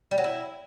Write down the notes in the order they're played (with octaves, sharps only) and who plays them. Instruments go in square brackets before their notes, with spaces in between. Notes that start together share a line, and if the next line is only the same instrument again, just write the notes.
[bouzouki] G3
F#3
E4